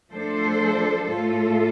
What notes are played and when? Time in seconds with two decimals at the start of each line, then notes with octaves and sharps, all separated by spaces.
0.11 F3 A3 D4 A4 C5
1.09 A2 A3 F4 A4